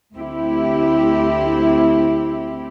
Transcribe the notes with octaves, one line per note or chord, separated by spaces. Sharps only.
D2 C4 E4 G4